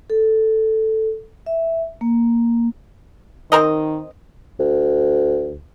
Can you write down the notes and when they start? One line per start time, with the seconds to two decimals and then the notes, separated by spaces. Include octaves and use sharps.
0.10 A4
1.46 E5
2.01 A#3
3.52 D#3 C4 A#4 D#5
4.60 D2